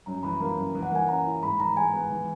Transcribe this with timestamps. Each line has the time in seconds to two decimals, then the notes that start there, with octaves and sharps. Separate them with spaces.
0.06 F#2 A#5
0.23 E3 B5
0.40 A#3 A#5
0.57 F#2
0.75 E3
0.83 F#5
0.91 A#3 G#5
1.08 C#4 A#5
1.25 E4
1.42 G#2 B5
1.59 E3 A#5
1.76 G#3 G#5
1.93 B3
2.11 E3